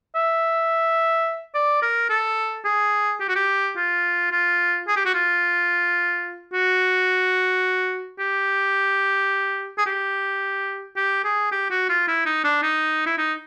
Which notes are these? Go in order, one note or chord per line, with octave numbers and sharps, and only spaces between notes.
E5
D5
A#4
A4
G#4
G4
F#4
G4
F4
F4
G#4
G4
F#4
F4
F#4
G4
G#4
G4
G4
G#4
G4
F#4
F4
E4
D#4
D4
D#4
E4
D#4